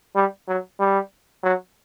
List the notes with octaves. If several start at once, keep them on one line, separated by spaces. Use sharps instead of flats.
G3
F#3
G3
F#3